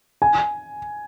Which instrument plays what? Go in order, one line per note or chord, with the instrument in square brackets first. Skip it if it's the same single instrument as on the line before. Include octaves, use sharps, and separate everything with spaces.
[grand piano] G#5